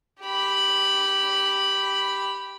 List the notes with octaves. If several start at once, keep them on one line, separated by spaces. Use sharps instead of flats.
G4 B5